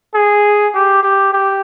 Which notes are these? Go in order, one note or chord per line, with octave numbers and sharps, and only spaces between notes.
G#4
G4
G4
G4